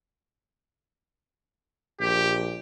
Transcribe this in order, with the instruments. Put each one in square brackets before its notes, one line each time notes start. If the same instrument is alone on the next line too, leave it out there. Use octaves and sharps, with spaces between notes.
[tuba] A#1 [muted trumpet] G4